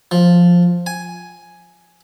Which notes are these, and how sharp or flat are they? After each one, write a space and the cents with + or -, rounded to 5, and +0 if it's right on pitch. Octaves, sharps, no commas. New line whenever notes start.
F3 +5
G#5 +5